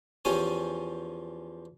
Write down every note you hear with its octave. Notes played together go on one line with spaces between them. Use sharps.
E2 F3 C#4 G4 C#5 G#5